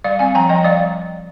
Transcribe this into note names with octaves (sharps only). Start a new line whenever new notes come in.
G3 D5 F5
C4 F5 G#5
F3 G5 A#5
F3 D#5 G5
G3 D5 F5